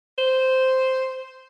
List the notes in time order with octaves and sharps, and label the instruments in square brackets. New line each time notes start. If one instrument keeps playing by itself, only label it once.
[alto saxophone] C5